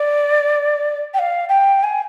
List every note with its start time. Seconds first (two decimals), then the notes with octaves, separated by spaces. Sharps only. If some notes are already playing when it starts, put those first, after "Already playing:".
Already playing: D5
1.14 G5
1.19 F5
1.49 G5
1.83 G#5